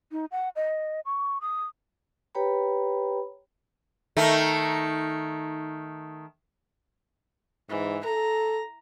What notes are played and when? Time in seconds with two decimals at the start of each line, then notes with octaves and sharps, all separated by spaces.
0.12 D#4
0.31 F#5
0.56 D#5
1.05 C#6
1.41 D#6
2.35 G4 B4 C#5 G5 A#5 B5
4.17 D#3 A3
7.70 G#2 E3
8.05 A4 A#5